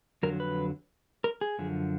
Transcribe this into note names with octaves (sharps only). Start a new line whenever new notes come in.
F2 D3 F#3 A#4
B4
A#4
G#4
F#2 D3 F3